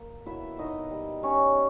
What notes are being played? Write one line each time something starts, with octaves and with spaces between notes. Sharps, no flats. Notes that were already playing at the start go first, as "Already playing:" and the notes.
Already playing: A#3
B2 E4 E5
B2 D#4 D#5
G3
G3 C#4 C#5